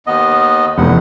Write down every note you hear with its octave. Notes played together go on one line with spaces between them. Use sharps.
D#2 B3 D#5
F1 E2 F#5